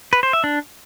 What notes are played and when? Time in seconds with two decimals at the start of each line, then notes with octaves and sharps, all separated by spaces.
0.13 B4
0.23 C5
0.33 E5
0.44 D4